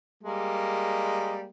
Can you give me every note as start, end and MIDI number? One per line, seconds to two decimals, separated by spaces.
0.24 1.49 55
0.24 1.49 56
0.24 1.49 58